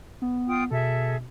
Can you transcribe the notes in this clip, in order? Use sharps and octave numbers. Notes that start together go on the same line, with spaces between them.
B3
F4 G5 D#6
B2 G#4 A4 E5